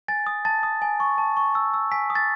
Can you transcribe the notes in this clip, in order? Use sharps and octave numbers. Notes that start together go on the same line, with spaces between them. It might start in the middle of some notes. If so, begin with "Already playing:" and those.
G#5 A6
D#6
A5 A6
D#6
G#5
C#6
A5
C#6
E6
E6
G#5 B6
D#6
A6